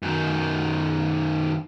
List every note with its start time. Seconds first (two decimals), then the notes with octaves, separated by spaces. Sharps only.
0.02 F#2 D#3